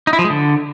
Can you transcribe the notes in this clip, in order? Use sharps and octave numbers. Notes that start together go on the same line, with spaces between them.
D#4
E4
F3
G#3
D3